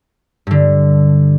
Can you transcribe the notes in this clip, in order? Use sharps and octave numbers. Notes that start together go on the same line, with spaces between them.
G2 D3